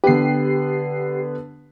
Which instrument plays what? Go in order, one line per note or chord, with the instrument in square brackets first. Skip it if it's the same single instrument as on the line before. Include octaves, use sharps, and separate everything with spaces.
[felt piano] D3 B3 B4 [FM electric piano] G4 C7